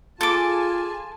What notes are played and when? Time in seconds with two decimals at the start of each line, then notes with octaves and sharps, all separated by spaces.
0.21 F4 G#4 A4 G#5 A5 D6